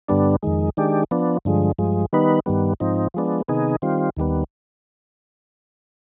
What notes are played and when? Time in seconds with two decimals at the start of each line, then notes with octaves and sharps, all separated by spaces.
0.08 G2 D3 G3 B3 D4
0.43 F2 D#3 G#3
0.77 D#3 G#3 D4 G4
1.11 F3 B3 D4
1.45 G2 D3 F3 G#3
1.79 G2 F3 G#3
2.13 D#3 G3 B3 D#4 B4
2.46 G2 D#3 G3 B3
2.80 G#2 F3 C4 D#4
3.14 F3 G#3 B3 D4
3.48 C3 D#3 B3 D#4 G#4
3.82 D#3 G3 C4 F4
4.17 D#2 D#3 G3 B3